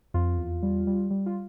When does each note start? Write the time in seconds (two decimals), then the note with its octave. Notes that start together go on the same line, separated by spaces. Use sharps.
0.14 F2 F4
0.38 E2
0.63 G3
0.87 G3
1.11 G3
1.26 F4